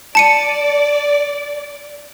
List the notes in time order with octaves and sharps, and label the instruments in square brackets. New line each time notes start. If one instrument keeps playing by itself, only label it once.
[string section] D5 [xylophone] A5 C#7 D#7